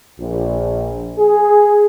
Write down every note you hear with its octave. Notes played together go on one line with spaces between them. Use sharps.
A#1
G#4